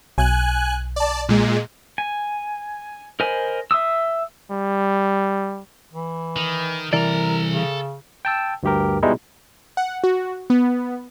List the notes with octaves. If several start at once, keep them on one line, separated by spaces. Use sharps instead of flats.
B1 G#5 F#6
D5 A5
A#2 G#3
G#5
A#4 C5 D#5 G#5 B5
E5 C6 D#6 E6
G3
E3
D#3
C2 E3 A4 A#4 D5 A#5
C#3
G5 A5 E6
D2 G2 G4 A#4
B2 G3 G#3 D#4 E4
F#5
F#4
B3